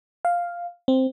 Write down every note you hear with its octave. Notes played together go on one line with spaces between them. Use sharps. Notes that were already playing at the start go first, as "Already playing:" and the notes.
F5
C4